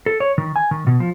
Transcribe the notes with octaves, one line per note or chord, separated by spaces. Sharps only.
A4
C#5
D#3
G#5
D#3
B2
F3